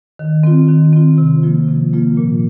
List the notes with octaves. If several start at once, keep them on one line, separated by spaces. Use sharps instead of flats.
D#3
C4 F4
D#3
C4 F4
C3
F3 A#3 F4
C3
F3 A#3 F4
A#2